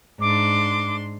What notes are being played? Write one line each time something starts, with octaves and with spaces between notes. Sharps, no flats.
G#2 D4 C6 D6